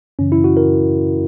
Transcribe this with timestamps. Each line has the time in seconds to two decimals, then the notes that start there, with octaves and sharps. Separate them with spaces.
0.19 F#2 C#3 E3 C#4
0.32 E4
0.44 F#4
0.57 A#4